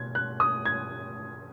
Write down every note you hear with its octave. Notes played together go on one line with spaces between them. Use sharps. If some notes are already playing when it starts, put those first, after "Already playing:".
Already playing: B2 G#6
F#6
D#6
G#6